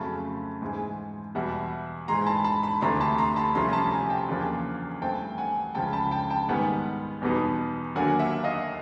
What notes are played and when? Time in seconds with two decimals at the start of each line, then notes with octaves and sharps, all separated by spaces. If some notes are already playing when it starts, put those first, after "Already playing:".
Already playing: F2 C#3 F#3 A3 A5 B5
0.62 G#2 E3 G#3
1.35 E2 B2 G3 E5 F#5
2.08 G#2 E3 G#3 A#5 C6
2.27 A5 B5
2.44 A5 B5
2.63 A5 B5
2.81 D2 C3 E3 A3 D4 A#5 C6
3.00 A5 B5
3.18 A#5 C6
3.36 A5 B5
3.55 C2 C3 F3 A3 C#4 A#5 C6
3.69 A#5
3.73 A5 B5
3.91 G#5 A#5
4.10 G5 A5
4.28 E2 C#3 F3 A#3 D4
5.01 G2 E3 A3 C4 G5 A5
5.38 F#5 G#5
5.75 C#2 C#3 F3 G5 A5
5.93 A5 B5
6.11 G5 A5
6.30 G5 A5
6.48 G#2 D#3 G3 B3 F#5 G#5
7.22 E2 B2 G3 B3 D#4
7.95 D#2 D3 F#3 A#3 D4 F#5 G#5
8.19 E5 F#5
8.44 D#5 F5